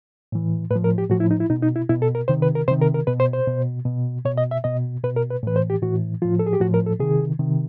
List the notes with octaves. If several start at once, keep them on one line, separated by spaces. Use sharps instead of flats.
A2 E3
A2 F3 B4
A#4
G4
A2 F3 F#4
E4
D#4
E4
B2 D#4
D#4
E4
B2 E4
A4
A#4
C3 D#3 C5
B4
A#4
C3 D#3 C5
A#4
A#4
B2 B4
C5
C5
B2
B2
B2 C#5
D#5
E5
B2 D#5
B2 B4
A#4
B4
A2 E3 B4
C5
G4
A2 E3 F#4
A2 F3 F4
A4
G#4
G4
A2 F3 F#4
A#4
A4
C3 D#3 G#4
C3 D#3